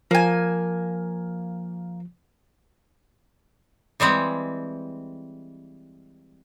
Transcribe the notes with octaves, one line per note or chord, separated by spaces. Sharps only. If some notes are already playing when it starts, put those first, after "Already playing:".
F3 A#3 G#5
E3 G3 G#3 C4